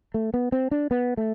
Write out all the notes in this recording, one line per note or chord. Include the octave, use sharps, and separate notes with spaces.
A3
B3
C4
D4
B3
A3